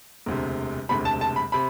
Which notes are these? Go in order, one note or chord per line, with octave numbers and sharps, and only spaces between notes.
E1 D2 C3
E1 D2 C3 B5
A5
A5
B5
C3 B5